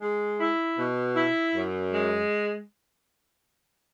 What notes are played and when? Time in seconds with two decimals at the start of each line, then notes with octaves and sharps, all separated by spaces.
0.01 G#3
0.40 E4
0.79 B2
1.16 E4
1.55 F#2
1.93 G#3